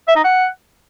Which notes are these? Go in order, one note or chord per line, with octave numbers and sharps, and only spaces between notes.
E5
D#4
F#5